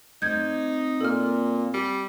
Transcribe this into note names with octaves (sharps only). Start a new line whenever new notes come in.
A3 C4 D#4 D5 G6 G#6
A#2 A4 F6
G3